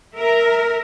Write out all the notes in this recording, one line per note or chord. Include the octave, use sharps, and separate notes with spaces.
A#4 E5